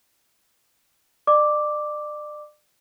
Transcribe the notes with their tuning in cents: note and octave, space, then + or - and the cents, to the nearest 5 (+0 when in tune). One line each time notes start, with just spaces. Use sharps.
D5 +35 D6 +0